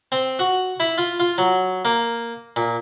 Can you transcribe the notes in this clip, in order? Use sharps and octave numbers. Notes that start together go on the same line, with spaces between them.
C4
F#4
E4
F4
F4
F#3
A#3
A#2